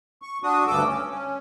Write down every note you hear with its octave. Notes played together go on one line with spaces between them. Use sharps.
C#6
D4 F#4 D#6
D2 G2 A4 D6 E6
C#4
C#4